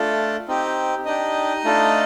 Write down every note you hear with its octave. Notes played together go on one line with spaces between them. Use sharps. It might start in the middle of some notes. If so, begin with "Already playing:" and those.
Already playing: A3 D4 F4 A4
C4 D#4 G4
D4 D#4 G4 D#5
A3 D4 F4 A4